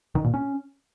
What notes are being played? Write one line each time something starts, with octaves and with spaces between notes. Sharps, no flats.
D#3
A#2
C#4